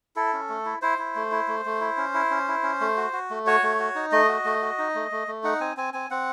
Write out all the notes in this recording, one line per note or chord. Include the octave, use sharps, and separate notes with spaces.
E4 A4
C#4
A3
E4
E4 C5
E4
A3
E4
A3
A3
E4
C#4
E4
C#4
E4
C#4
A3
F#4
F#4
A3
F#4 C#5
A3
F#4
D#4
A3 D#5
F#4
A3
F#4
D#4
A3
A3
A3
D#4 F#5
C4 G#5
C4 G#5
C4 G#5
C4 F#5